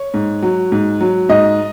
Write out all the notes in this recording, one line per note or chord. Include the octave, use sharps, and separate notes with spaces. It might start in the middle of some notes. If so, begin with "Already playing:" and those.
Already playing: C#5
G#2
F#3
G#2
F#3
G#2 D#5